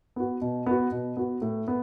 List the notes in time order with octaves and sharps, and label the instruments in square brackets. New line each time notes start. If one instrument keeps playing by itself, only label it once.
[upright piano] B3 F#4
B2
B3 F#4
B2
B3 F#4
A2
B3